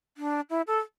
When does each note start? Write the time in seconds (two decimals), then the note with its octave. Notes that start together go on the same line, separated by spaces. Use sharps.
0.17 D4
0.50 E4
0.67 A4